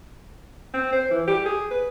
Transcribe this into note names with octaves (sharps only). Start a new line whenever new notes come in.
C4
C5
E3
G4
G#4
B4